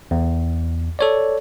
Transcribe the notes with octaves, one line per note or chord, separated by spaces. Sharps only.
E2
A4 C#5 D5